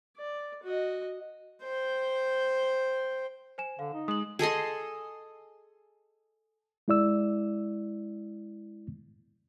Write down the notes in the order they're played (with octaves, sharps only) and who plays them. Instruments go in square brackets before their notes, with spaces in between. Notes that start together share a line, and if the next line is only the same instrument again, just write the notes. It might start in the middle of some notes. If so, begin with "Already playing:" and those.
[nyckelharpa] D5
F#4 D#5
C5 G5
[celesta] C5 G#5 E7
[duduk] D3 [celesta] F5
[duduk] D#4
[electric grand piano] G#3 [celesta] D#6 F#7
[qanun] G#4 A4 D#5 C6
[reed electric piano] G#3 E4 D5 E6